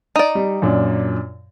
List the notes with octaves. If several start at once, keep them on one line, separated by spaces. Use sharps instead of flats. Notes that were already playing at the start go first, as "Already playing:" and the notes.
D#4 D5
G3
F#2 A#2 D4